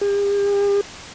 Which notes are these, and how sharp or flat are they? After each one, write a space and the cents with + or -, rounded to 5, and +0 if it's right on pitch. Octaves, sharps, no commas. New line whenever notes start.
G4 +45